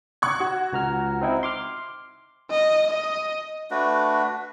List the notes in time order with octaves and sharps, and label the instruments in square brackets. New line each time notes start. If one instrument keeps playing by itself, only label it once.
[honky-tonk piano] C#6 F#6 G#6
F#4
[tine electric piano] C#2 A#5 F6
C4 D#4 E4
C6 D6 F6
[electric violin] D#5
D#5
[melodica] A3 D4 F#4 B4